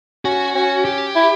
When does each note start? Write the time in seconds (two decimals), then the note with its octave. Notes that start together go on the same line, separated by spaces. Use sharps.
0.25 C#4 F#4
0.55 C#4
0.85 G4
1.15 E4